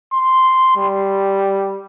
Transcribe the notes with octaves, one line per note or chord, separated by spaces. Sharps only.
C6
G3